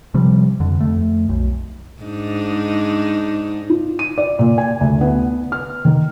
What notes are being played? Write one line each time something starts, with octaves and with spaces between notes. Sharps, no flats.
C3 F3 G3
F2 D3
F2 A3
B1
G#2 D4 D#4
F4
D#7
D5
A#2
G#5
D2
B3
F6
D#3